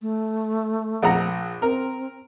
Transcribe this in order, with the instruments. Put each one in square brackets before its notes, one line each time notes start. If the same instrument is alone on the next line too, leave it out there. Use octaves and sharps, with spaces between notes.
[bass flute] A3
[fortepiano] A#1 F#5 A#5
[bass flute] C4 [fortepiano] A#4